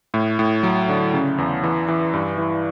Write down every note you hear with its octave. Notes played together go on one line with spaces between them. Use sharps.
A2
A2
F#3
D3
C#3
E2
E3
E3
G2
E3